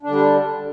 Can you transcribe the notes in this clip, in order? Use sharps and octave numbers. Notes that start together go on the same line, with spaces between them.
D3 G3 D4